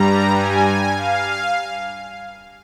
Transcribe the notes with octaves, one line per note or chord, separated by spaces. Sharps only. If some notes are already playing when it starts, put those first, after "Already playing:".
Already playing: G2 G3 A#5
G#5
F5